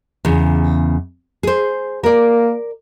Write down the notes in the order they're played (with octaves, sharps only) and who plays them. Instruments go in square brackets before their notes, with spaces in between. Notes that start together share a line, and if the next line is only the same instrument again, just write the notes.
[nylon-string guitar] E2 C#3
G#4 C5
[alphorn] A#3 [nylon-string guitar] A#4 D5